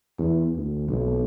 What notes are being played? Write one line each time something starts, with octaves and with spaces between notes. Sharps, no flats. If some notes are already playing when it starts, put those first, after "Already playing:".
E2
D2
B1